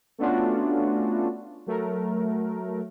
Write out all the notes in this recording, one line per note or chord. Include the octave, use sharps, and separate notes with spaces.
A3 B3 C#4 D4 F4 F#4
F#3 A3 A#4